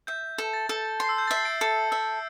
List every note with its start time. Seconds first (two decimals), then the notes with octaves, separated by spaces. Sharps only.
0.07 E5 G6
0.38 A4
0.53 A6
0.69 A4
1.00 C6 C7
1.09 E6
1.18 G6
1.27 E5 A6
1.37 C7
1.45 A6 D7
1.61 A4
1.91 E5 E6